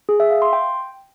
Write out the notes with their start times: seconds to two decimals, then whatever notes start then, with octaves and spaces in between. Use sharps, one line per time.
0.09 G#4
0.20 E5
0.31 F5
0.42 C6
0.53 G5